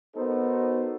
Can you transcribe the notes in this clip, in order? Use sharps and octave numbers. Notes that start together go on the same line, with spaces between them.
B3 D#4 F#4 A4 A#4 C5